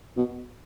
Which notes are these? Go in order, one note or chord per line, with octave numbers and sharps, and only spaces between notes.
B2